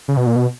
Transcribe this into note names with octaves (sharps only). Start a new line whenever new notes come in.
C#3
B2
A#2
B2